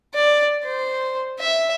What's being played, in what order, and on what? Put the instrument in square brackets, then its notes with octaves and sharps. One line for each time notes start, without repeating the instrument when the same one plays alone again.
[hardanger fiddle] D5
C5
E5